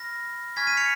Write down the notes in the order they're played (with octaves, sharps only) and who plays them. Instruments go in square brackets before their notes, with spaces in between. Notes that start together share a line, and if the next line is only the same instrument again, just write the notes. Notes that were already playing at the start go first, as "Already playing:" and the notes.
Already playing: [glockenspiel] B5 F6 A#6
G#5 C#6 F6 G#6 B6
B6 D#7
C#7 F7